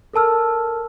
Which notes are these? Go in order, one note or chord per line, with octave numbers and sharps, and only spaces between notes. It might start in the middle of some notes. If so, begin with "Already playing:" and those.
A4 A#4 A5 E6 F6